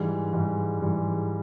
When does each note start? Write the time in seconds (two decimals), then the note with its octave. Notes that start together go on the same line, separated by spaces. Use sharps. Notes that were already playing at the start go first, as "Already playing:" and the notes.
Already playing: G#2 E3 G3
0.33 G#2 E3 G3
0.80 G#2 E3 G3